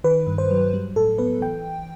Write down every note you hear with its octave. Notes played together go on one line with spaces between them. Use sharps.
D#3 B4
G2
C5
F#3
G3
A2 A4
B3 B4
E3 G5